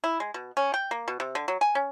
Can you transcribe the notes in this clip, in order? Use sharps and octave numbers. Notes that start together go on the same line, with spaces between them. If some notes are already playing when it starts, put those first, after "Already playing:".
E4
G#3
B2
C#4
G5
A#3
B2
C3
D3
F#3
G#5
C#4